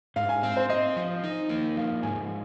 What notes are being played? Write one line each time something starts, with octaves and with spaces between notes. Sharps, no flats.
G#2 F5
G#5
C4 F5
C5
C4 D#5
F3
D#4
A#3
F3 F5
G#2 G#5